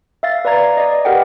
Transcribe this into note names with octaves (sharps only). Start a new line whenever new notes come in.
E5 F5 A6
B4 D5 F5 A#5 G#6 A6
D5 D#5
G4 A#4 B4 D#5 F#5 G5